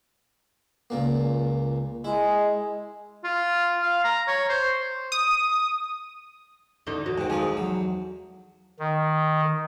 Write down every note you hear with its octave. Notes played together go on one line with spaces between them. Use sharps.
C#2 A#2 A#3
G#3 E4
F4
F5
A#5
C#5
C5
D#6
E2 D3 D#4
F#3
G#2 D#3
E2 F3 G#3 D#4
F#3
D#3